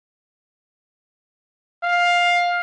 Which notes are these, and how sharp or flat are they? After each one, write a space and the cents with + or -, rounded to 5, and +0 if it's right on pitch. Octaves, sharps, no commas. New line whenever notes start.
F5 +10